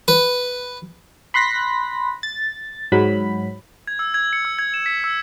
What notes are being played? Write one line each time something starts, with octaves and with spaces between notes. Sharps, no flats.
B4
B5 C6 F#6 A#6 B6
A6
G#2 F#3 B5
G#6
E6
G#6
C#7
E6
G#6
E7
B6
E6